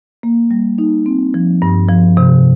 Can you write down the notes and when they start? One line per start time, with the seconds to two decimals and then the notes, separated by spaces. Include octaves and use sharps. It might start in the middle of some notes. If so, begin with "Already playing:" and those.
0.23 A#3
0.51 G3
0.78 D#4
1.06 C4
1.34 F3
1.62 G2
1.89 F3
2.17 C3